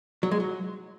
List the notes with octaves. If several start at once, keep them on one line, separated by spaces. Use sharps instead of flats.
F#3
G#3
F#3